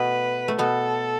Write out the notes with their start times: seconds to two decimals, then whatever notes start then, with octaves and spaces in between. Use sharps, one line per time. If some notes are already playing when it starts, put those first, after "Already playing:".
Already playing: B2 A3 B3 B4
0.48 A3
0.58 B2 B3 A4